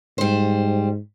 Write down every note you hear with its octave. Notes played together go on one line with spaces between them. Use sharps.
G#2 G3 C5